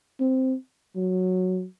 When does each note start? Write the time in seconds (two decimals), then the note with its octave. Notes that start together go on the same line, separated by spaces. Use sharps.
0.20 C4
0.96 F#3